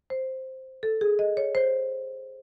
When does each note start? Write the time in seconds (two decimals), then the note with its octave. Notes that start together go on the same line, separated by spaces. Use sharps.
0.10 C5
0.83 A4
1.01 G#4
1.19 D#5
1.37 C#5
1.55 C5